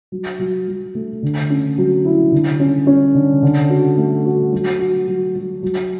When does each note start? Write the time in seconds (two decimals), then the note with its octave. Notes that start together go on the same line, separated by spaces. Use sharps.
0.12 F#3
0.39 F#3
0.68 F#3
0.95 A3
1.23 D3
1.50 C#4
1.78 F#3
2.05 E4
2.32 D3
2.60 C#4
2.87 C#4
3.15 D3
3.43 D3
3.70 F#4
3.97 A3
4.25 F#4
4.53 F#3
4.79 F#4
5.07 F#3
5.35 F#3
5.63 F#3